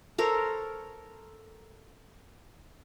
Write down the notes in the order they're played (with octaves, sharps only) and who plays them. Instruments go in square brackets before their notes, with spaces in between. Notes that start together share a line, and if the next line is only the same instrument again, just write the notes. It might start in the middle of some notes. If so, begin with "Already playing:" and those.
[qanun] A4 A#4 C5 C#5